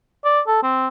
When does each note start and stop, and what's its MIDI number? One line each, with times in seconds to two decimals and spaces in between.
0.25 0.41 74
0.47 0.61 69
0.63 0.88 60